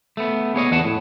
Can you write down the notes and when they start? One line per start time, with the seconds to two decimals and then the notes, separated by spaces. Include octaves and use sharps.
0.17 A3 B3
0.54 B3 G#4 C#5 D#5
0.71 E2 B4 F#5 A5
0.85 A2